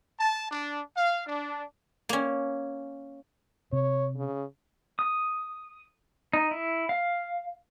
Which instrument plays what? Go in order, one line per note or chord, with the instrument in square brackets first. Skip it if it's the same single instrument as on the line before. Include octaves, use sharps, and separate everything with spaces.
[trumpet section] A5
D4
F5
D4
[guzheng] A#3 C#4
[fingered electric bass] C3 [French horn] C#5
[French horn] C#3
[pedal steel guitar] D#6
D#4
E4
F5